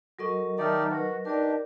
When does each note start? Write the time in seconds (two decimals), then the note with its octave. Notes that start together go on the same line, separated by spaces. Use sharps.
0.19 F#3 F#4 A4 A#4 D#5 C#6
0.58 D#3 D#4 G4 D5 E5 A5 F6
0.91 F#4 B4 A#6
1.25 D4 D#4 G4 A#4 D5